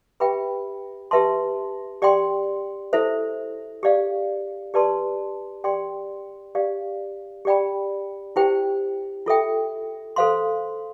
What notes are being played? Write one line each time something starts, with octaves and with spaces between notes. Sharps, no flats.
G4 B4 E5 G5 B5
G4 B4 E5 A5 C6
G4 D5 G5 C6
E4 A4 C5 E5
G4 D5 F5
G4 B4 D5 A5 C6
G4 D5 G5 C6
G4 D5 F5
G4 D5 G5 B5
E4 G4 C5 G5
F4 A4 E5 G5
A4 C5 F5 C6